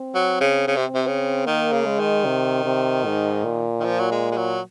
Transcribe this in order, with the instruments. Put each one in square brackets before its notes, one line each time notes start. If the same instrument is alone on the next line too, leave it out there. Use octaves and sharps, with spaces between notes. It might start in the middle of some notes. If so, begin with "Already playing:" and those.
Already playing: [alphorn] C4
[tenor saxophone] F#3
C#3
C#3
C3
C3
C#3
[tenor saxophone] D#3 [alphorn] A#3
[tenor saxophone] C#3
[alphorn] G#3
[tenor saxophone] D#3
[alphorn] C3
C3
G#2
A#2
[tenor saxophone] D#3
F3
F#3
G#3
G#3
F#3